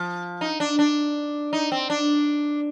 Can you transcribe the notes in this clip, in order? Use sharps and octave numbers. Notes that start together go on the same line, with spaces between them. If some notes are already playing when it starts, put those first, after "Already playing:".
Already playing: F3
D#4
D4
D4
D#4
C4
D4